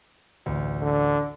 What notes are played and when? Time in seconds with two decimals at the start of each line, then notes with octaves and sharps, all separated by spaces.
0.46 A1 D2
0.82 D3